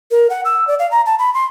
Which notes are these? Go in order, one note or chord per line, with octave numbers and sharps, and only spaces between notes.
A#4
F#5
E6
D5
F5
A#5
A5
B5
C6